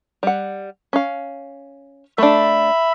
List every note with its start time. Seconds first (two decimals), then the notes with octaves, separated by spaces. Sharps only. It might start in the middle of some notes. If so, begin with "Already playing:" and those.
0.23 G3 F#5
0.93 C#4 F5
2.18 A3 D4 E5 B5